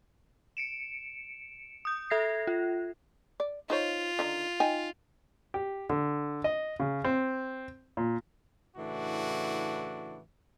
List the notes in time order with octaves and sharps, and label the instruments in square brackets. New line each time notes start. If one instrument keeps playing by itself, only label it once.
[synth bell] C#7 D7 E7
D#6 G6
A4 E5 G#6 A#6 C7
F4
[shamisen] D5
[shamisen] D#4 C5 C#5 [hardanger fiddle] F4
[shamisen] D3 D#3 D#4
D#4 G5 G#5
[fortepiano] G4
D3
D#5
C#3
C4
A#2
[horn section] A2 C#3 E3 D4 F#4